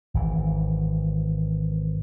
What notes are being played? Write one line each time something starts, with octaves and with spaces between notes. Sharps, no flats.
G#1 E3